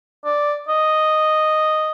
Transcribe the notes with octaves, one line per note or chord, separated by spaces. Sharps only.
D5
D#5